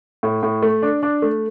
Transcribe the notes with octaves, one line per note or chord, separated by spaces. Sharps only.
A2
A2
A3
D4
D4
A3